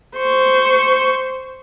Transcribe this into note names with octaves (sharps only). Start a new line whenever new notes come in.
C5 C#6